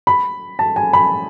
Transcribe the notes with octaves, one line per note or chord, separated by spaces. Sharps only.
B5
A5
G#5
B5